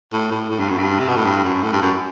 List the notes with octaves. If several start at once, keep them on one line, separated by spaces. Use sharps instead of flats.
A2
A2
A2
G2
F#2
G2
C3
B2
A2
G2
F#2
A2
G2
F#2